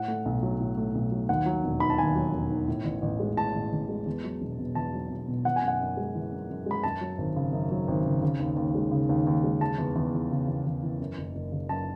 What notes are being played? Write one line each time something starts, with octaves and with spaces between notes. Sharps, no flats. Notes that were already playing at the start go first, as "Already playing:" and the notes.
Already playing: A2 F#5
A3
B1
F#3
A2
A3
B1
F#3
D#2 F#5
F#3
E1
D#3 B5
A5
D#2 G#5
F#3
E1
D#3
A2
A1
A1
G#3
A2 A5
A1
A1
G#3
E2
F#3
E1
B2
E2 A5
F#3
E1
B2
E3 F#5
G#5
F#2
F#5
F#2
G#3
E3
F#2
F#2
G#3 B5
F#2 A5
F#3
G#1
C#3
F#2
F#3
G#1
C#3
C#3
D#2
D#2
G#3
C#3
D#2
D#2
G#3
C#3 A5
E2
E2
E3
C#3
E2
E2
E3
F#2
F#1
F#1
C#3
F#2 A5